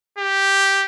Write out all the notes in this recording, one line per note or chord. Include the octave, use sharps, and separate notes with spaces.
G4